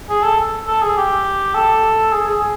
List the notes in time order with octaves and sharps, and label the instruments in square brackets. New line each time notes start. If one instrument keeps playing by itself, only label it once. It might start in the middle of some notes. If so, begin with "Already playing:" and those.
[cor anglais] G#4
A4
A4
G#4
G4
A4
G#4
G#4